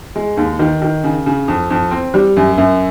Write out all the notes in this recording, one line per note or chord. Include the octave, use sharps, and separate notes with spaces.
G#3
D#2
D#3
D#3
C#3
C#3
F2
F2
C4
G3
F#2
F#2